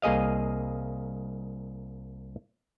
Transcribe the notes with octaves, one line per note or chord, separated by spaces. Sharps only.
C2 A#3 G#4 D#5 F5